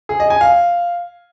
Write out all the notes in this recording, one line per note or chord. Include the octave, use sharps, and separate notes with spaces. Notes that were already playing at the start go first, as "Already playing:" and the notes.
G#4
D#5
G#5
F5